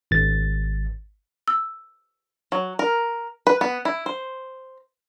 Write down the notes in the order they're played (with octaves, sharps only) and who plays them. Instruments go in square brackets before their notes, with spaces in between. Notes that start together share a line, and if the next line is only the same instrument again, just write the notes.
[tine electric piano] G#1 A6
[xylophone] E6
[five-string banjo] F#3
A#4
B4
B3
E4
C5